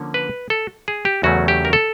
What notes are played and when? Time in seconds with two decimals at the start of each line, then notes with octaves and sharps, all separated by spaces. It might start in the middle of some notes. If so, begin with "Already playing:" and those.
Already playing: D3 F3 A#3 C#4
0.14 B4
0.50 A4
0.88 G#4
1.05 G4
1.23 E2 C#3 F#3 A3 C#4 F#4
1.48 G4
1.65 A#4
1.73 A4